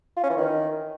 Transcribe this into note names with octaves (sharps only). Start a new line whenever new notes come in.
F4
C#4
E3
D#3